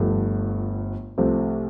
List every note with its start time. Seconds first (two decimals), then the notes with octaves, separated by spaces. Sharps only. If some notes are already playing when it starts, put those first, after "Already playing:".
Already playing: G1 G2 F3 A3
1.18 C2 C3 F3 A3 C4